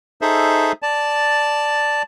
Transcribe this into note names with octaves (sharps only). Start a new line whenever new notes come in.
D#4 G#4 A4 C5 E5
D5 A5